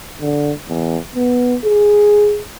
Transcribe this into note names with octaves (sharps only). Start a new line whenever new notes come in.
D3
E2
B3
G#4